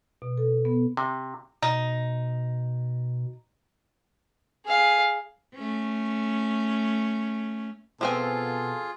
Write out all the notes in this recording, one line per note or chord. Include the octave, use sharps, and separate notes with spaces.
B2
A4
B3
C3
B2 D#4
G#4 F5
A3 C#4
B2 F3 C4 F4 G#4 A4 G#5